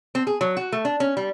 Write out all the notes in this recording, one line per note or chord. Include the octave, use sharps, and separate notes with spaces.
C4
G#4
F#3
F#4
A3
D4
C#4
G3